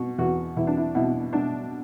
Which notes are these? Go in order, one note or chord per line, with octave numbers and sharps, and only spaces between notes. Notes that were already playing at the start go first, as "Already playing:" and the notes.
Already playing: B2 F#4
E2 F#4
E2 E4
D4
E4
B2 E4
B2 D4